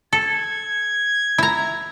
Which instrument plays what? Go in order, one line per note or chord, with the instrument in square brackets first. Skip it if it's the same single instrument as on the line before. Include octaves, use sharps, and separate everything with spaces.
[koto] A4 [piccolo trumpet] G#6
[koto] E4 A#5